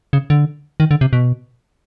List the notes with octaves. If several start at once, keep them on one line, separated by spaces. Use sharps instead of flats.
C#3
D3
D#3
D3
C3
B2